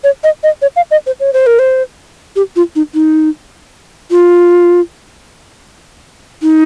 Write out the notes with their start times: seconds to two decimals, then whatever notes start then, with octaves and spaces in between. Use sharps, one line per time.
0.04 C#5
0.24 D#5
0.43 D#5
0.62 C#5
0.76 F5
0.91 D#5
1.06 C5
1.20 C#5
1.33 C5
1.47 A#4
1.59 C5
2.36 G4
2.56 F4
2.76 D#4
2.94 D#4
4.11 F4
6.42 D#4